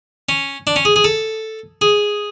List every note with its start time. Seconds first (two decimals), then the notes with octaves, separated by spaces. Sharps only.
0.29 C#4
0.67 D4
0.76 C#4
0.85 G#4
0.96 G#4
1.04 A4
1.81 G#4